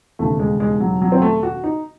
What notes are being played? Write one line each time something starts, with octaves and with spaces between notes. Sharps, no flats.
E1 D#2 C#3 A3
G#3
G#3
F#3
F#3
C4
A3
F#4
D#4